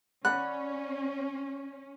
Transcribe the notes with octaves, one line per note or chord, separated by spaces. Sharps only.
C#4 D5 F#5 B5 F#6